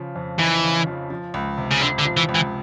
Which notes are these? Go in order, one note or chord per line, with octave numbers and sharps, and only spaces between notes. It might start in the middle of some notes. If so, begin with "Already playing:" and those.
Already playing: C#3 F3
F2
F1 E3
C#3
F3
F3
C#2
C3
C#3
C#2 D3
D3
F3
E3
C#2
E3